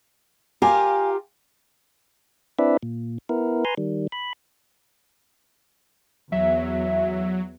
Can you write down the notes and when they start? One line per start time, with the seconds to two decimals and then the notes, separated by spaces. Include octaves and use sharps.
0.62 F4 G4 A#4 F5 G#5
2.59 C4 D4 E4 B4 D5 E5
2.83 A#2
3.29 B3 E4 A#4
3.65 B4 G#5 A#5 C6
3.77 D#3 G3
4.12 B5
6.32 E2 F#3 E5